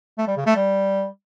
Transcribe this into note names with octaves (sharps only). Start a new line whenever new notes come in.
A3
G3
C#3
A3
G3